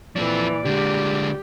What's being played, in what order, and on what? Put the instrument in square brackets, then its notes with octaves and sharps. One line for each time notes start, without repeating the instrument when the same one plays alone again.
[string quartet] A#2 E3 [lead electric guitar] F3 C4 [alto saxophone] D5
[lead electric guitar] D3 G#3 [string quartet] G4